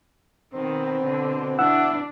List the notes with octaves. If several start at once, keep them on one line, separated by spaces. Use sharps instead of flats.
B2 D#3 C4
D3
B2 B3 D4 E4 F#5 E6